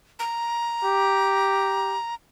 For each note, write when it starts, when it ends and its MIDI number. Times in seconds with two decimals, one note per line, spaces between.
0.19 2.14 82
0.84 1.96 67